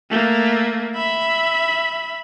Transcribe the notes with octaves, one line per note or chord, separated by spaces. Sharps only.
A3 A#3
E5 B5